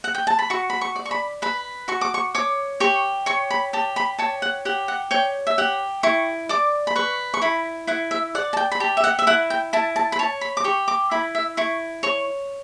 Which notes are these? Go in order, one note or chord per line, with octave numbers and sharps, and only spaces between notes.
F#5
G5
A5
B5
F#4 C#6
B5
C#6
D5
C#6
B5
B4 B5
F#4 C#6
D6
C#6
C#5 D6
G4 C#6
C#5 C#6
B5
G4 A5
B5
C#5 A5
F#5
G4 F#5
F#5
C#5 G5
E5
G4 F#5
E4 C#6
D5 D6
B5
B4 C#6
C#6
E4 B5
E4 F#5
E5
D5 F#5
A5
G5
B5
G4 A5
E5
F#5
E5
E4 F#5
G5
E4 A5
A5
B5
C#5 A5
B5
D6
G4 C#6
D6
E4 B5
E5
E4 C#6
C#5 C#6